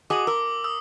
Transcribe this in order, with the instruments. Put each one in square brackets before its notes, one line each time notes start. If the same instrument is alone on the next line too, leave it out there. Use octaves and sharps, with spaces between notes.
[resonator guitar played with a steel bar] F#4 G#4 D#5 [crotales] D6 F#7
[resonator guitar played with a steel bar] A#4 [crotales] D6 E6
[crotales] D#6 E6